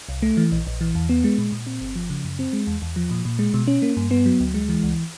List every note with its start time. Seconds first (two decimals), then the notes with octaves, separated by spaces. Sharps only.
0.09 C2
0.22 A3
0.37 E3
0.52 A#1
0.67 A#1
0.81 E3
0.95 E2
1.09 B3
1.24 G#3
1.38 A#2
1.52 A#2
1.67 C4
1.81 G1
1.96 F3
2.10 C#3
2.24 F#2
2.39 C4
2.53 G#3
2.67 E2
2.82 E2
2.96 F3
3.11 A#2
3.25 A#2
3.39 G#3
3.54 B2
3.67 C#4
3.82 A#3
3.97 G2
4.11 B3
4.26 F#3
4.40 D2
4.54 G#3
4.69 E3
4.83 C#2